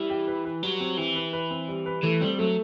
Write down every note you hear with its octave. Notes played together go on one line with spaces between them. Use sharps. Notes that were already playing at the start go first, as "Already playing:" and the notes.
Already playing: E3 G3
G4
B4
B4
F#3 G3
C4
E3 G4
B4
B4
C4
G3
B4
E3 A3
G3 C4
F#3 A3